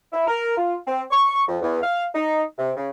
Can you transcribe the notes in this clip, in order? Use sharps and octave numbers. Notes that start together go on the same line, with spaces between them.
E4
A#4
F4
C4
C#6
F2
E2
F5
D#4
C3
C#3